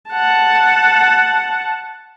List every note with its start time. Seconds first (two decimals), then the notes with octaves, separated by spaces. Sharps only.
0.11 F#5 A5